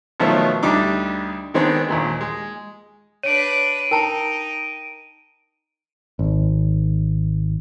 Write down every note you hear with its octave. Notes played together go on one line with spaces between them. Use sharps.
B2 D#3 F3 F#3 A3 B3
D2 G3 D4 D#4 D6
D#3 G#3 B3 C4 D4
D#2 A#2 G#3
G#3
D4 B4 C#5 D7 D#7
D#4 A#4 G5 A5 A#5
G#1